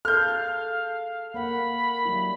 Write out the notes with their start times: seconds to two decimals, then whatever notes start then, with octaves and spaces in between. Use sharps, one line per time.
0.05 G#4 A4 F5 F6 G6
1.34 A#3 F#5 B5
2.05 F#3 G3 E4